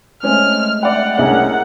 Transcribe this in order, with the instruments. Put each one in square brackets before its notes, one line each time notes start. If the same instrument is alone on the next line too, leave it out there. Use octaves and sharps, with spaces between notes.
[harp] G#3 A3 [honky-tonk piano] C4 C#4 [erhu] F6
[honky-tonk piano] D5 E5 G5 [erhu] F#5
[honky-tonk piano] C2 C#4 F#7 [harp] G#4 A#4 [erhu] F#5